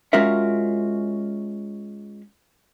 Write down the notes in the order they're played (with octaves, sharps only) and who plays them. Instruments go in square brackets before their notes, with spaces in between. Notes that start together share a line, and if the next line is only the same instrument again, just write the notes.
[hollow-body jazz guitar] G#3 C#4 F4 F#4 A#4 E5